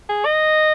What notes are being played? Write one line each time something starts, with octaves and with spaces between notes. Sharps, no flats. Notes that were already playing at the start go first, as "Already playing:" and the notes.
G#4
D#5